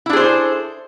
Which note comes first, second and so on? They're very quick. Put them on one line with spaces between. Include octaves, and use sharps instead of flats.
E4 D4 G#4 C5 A4